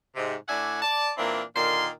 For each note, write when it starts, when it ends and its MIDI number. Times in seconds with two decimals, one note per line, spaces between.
0.16 0.36 44
0.16 0.36 48
0.48 0.79 45
0.48 0.79 62
0.48 0.79 74
0.48 0.79 76
0.48 0.79 78
0.48 0.79 80
0.83 1.11 74
0.83 1.11 81
1.17 1.42 46
1.17 1.42 52
1.17 1.42 58
1.17 1.42 60
1.17 1.42 62
1.17 1.42 64
1.56 1.88 46
1.56 1.88 50
1.56 1.88 51
1.56 1.88 58
1.56 1.88 84